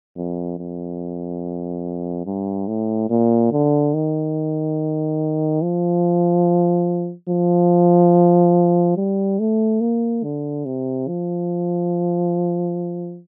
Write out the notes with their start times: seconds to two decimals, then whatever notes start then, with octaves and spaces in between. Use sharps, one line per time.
0.17 F2
0.58 F2
2.26 G2
2.68 A2
3.10 A#2
3.52 D3
3.94 D#3
5.62 F3
7.29 F3
8.97 G3
9.39 A3
9.81 A#3
10.24 D3
10.66 C3
11.08 F3